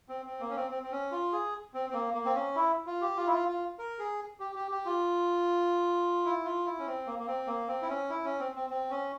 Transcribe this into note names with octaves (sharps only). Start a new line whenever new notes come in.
C4
C4
A#3
C#4
C4
C4
C4
C#4
F4
G#4
C4
C4
A#3
A#3
C4
C#4
E4
F4
G4
F4
E4
F4
F4
A#4
G#4
G4
G4
G4
F4
E4
F4
E4
C#4
C4
A#3
A#3
C4
A#3
C4
E4
C#4
E4
C#4
C4
C4
C4
C#4